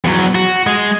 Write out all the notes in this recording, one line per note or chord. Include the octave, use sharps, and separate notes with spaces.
E2 F#3
F#4
G#3